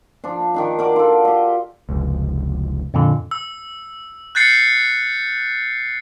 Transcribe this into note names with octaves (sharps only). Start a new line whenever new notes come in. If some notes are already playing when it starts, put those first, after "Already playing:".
F3 D4
D#3 D4 D#4
F#4 A#4 D5
F4 A4
G4 D#5
F1 C#2
F2 A#2 D3
E6
F#6 G6 A6 C7 C#7